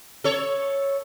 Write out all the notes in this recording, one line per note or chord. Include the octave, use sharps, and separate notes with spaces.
A4 C#5